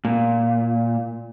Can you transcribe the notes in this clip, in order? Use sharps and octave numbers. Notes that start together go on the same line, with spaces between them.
A#2